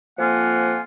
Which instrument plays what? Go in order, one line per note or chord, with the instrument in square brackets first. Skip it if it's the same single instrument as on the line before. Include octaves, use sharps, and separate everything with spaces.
[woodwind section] F2 F3 A#3 F4 F#5 G#5